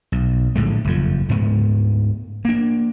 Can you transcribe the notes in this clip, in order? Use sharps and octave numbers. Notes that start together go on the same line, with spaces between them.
B1
A#1 A2 D3 G#3
F#1 F2 F3
D2 G#2 B3
A#3 D4